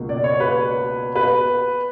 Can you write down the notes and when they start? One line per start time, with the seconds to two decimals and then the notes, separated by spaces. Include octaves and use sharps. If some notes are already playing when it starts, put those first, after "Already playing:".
Already playing: C#2 B2 A#3
0.09 D5
0.24 C#5
0.40 B4
1.15 B4